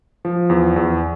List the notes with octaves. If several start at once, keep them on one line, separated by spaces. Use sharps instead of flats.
F3
E2
E2